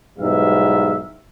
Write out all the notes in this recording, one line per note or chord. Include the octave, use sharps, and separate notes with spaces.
B1 E2 G#2 G3 E5 F5